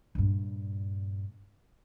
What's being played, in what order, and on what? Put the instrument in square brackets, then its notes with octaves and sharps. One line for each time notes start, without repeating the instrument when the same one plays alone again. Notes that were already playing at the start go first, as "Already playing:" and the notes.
[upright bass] G2 A#2